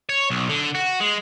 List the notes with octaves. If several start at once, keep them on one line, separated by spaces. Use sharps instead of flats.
C#5
B1
D3
F#4
G#3